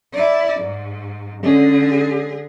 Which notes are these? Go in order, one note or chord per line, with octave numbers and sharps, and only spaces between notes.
E4 D5
G#2
D3 G#3 C#4 G#4